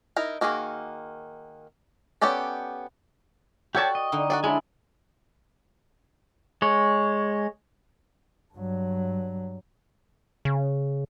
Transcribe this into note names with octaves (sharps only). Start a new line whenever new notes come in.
D#4 E4 A#4
D#3 A#3 F#4 G#4 A#4
B3 C#4 G4 A4 D5
F#4 G4 A4 C#5 D5 G5 A5 C#6
D#5
D3 D#4 E4
F#4 G#4 D5
F#3 G#3 D4 E4 G#4 E5 G#5
G#3 C#5
G2 F#3
C#3